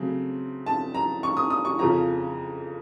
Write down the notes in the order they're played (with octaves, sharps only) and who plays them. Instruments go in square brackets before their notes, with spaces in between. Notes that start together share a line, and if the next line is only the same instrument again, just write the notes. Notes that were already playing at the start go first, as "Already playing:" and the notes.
Already playing: [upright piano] C#3 F#3 A3 C4
A5
A#5
C#6
D#6
D#6
C#6
F2 C#3 F3 A#5